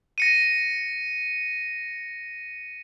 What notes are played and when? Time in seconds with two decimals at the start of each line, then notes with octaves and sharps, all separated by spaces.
0.18 A#6 C#7 D#7